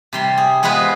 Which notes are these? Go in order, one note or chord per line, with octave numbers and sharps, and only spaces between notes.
C3 G3 C6
G#4
G#3 B3 F4 G#4 B4 C5